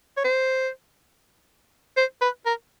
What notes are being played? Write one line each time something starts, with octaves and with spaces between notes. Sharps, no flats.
C#5
C5
C5
B4
A#4